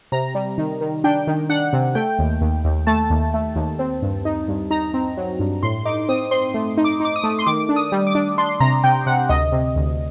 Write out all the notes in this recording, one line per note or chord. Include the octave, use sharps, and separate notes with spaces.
C3 A#5
G3
D#3
D#3
D4 G5
D#3
D4 F#5
C3
A3 G5
D#2
D#2
D#2
A3 A5
D#2
A3
D#2
C4
G2
D#4
G2
D#4 A#5
C4
F#3
G2
A2 C6
D#4 D6
C4 D#6
C4 C6
A3
D#4
D6
D#4 D6
D#6
A3
C6
D#3 D6
D4
D#6
G3
D6
D4
D4 C6
C3 A#5
C3 G5
C3 F#5
D2 D#5
C3
D2